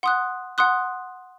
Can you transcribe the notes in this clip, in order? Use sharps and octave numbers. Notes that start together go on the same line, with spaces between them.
F#5 C6 D#6 F#6
F#5 C6 D#6 F#6